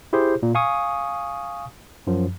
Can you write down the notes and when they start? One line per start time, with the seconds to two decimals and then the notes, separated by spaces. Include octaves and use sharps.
0.13 E4 G4 G#4 C5
0.43 A#2
0.55 F5 G#5 C#6 D#6
2.07 F#2 F3